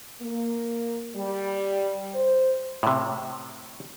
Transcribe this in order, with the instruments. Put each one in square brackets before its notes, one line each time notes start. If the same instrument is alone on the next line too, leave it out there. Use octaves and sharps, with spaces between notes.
[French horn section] A#3
G3
C5
[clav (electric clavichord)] A2 C3